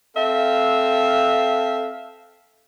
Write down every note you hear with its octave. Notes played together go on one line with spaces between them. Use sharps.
C4 A4 E5 F5